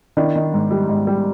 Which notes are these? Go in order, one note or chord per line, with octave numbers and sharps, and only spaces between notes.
D#3 D4 E4
D#3
G#2
G3
G#2
G3